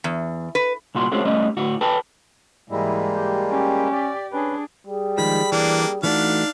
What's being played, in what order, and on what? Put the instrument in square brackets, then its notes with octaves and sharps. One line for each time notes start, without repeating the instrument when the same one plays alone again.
[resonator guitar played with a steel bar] E2
B4
[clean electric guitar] C2 A#2 F#4 C6
G#3 A3 C4 C#4 F#4
G3 A3 C#4 D#5
D2 A2 F#4
A4 B4 G5 A5
[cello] G#2 E3 [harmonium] G3 G#3 A#3 [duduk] E4
[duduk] G4
[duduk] C#4 [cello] G4
[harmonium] D5
[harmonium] C#4 [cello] D4 G#4 [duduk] B4
[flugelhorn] G3 [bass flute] G#4
[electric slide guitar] D#3 F3 G#3 [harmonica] B5
[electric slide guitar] E3 [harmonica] A#3 D4
[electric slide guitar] E3 A3 F#4 [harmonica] D4 F5 [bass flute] D#4